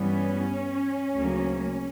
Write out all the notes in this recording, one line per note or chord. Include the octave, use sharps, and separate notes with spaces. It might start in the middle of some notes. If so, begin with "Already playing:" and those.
Already playing: G2 E3 G3 B3 C#4
D2 C#3 F#3 A#3